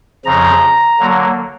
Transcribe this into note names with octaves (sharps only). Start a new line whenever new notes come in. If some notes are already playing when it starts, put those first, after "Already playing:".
F2 C#3 F3 A#5
D3 F#3 A#3